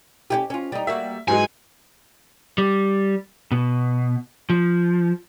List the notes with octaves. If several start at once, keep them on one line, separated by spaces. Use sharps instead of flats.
C#4 E4 G4
C#4 F4
G3 D#4
G3 A#3 F#4 E5
G#2 E3 F#3 G#3 G#5
G3
B2
F3